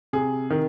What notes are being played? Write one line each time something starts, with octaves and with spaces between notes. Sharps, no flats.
C3 G#4
D#3